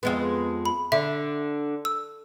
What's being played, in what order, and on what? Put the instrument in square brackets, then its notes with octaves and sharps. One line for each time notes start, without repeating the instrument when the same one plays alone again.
[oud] F2 G#3 B3
[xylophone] B5
[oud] D3 [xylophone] E5
[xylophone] E6